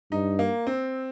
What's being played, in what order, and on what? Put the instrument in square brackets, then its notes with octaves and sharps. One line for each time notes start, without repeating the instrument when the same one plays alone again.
[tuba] G2 [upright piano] D#4
[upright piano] A#3
C4